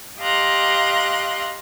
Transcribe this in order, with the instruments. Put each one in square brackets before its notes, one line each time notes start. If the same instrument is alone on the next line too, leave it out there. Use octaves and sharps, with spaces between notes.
[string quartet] G4 D#5 F5 A#5 C6 F#6